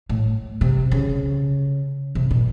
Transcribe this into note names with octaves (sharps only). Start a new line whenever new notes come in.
A2
C3
C#3
C3
A#2